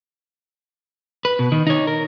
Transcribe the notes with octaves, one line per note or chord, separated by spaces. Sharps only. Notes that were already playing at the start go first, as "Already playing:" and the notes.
B4
B2
D#3
D#4 C#5
A#4